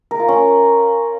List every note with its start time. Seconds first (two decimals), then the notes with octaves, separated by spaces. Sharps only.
0.11 A#4
0.20 F4
0.28 C#4